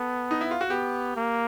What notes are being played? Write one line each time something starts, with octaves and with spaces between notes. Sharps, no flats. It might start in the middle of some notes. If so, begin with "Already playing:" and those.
Already playing: B3 A4
D#4
E4
F4
F#4
B3 G4
A#3